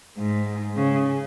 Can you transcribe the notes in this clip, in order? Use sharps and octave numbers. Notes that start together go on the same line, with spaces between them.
G#2
C#3